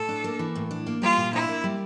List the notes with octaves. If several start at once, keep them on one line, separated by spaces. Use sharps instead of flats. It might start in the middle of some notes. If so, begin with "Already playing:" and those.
Already playing: A2 A4
D4
A#3
E3
A2
D4
A#3
G3 F4
A#2
D4 E4
A#3
G3